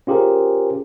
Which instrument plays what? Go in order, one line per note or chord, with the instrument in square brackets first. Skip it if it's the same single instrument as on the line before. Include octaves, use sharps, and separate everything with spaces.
[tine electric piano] C#4 F4 G4 G#4 A#4 C5